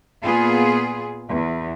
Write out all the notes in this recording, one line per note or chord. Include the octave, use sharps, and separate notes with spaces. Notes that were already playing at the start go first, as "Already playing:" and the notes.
A#2 B3 F4 G#4
E2